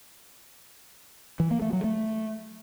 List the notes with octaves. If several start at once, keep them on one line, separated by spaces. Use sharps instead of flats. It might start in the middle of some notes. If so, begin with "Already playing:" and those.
E3
A#3
A3
F#3
A3